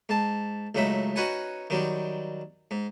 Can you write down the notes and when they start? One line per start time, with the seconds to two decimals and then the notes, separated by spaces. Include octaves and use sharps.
0.09 G#2 A5
0.75 C#2 A2 F#3 D#4 E5
1.16 C#4 D#4 F#4 B4 F#5 G#5
1.70 D#3 F#3 G3
2.71 G#2